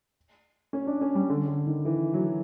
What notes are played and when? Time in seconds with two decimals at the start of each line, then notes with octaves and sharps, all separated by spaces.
0.73 C#4
0.87 D4
1.01 C#4
1.15 G3
1.29 D3
1.48 D3
1.67 D#3
1.85 E3
2.14 F#3